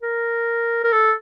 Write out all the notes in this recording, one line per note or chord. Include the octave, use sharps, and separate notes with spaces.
A#4
A#4
A4